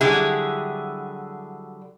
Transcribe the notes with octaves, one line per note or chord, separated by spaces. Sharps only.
D3 F#3 G3 E4 G4 G#4